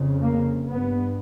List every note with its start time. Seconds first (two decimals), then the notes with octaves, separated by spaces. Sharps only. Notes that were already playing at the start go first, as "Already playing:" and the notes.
Already playing: F2 C#3
0.21 A#3
0.69 G2 B3